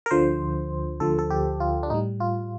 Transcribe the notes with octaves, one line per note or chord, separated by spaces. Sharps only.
A#4
D2 D3 F3 C5
D2 D3 F3 A4
A4
G4
F4
D4
A2 G3 D#4
F4